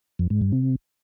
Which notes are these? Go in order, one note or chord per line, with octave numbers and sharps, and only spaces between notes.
F2
G#2
G2
C3